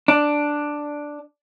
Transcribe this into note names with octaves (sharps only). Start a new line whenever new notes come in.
D4